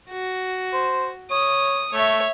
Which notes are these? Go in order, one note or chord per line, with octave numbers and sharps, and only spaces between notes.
F#4
C5
C#5 D#6
A3 C#5 E5